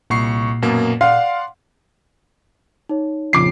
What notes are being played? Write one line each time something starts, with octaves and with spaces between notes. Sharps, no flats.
C2 A#2 C#6 C7
F#2 B2 A#3
D5 F5 F#5 C6
D#4 C#5
A#1 F2 C#3 D6 C7